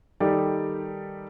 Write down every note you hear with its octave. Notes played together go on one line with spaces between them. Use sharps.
D#3 G3 D#4 G4 A4 D5